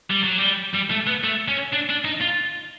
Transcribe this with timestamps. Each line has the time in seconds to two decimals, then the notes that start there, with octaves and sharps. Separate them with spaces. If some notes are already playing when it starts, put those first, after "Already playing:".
0.10 G3
0.24 F#3
0.38 G3
0.75 G3
0.91 A3
1.07 B3
1.24 A3
1.48 C#4
1.73 D4
1.89 D4
2.05 D#4
2.21 F4